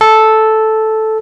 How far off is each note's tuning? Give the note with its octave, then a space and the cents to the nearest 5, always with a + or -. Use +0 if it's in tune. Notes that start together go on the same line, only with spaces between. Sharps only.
A4 -5